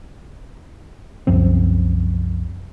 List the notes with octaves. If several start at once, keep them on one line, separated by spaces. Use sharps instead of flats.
C2 F#2 F3 C4